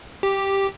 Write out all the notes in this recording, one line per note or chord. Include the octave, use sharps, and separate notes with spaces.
G4